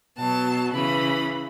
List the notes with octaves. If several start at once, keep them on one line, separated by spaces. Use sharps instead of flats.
B2 F#3 A5
C#3 E3 B5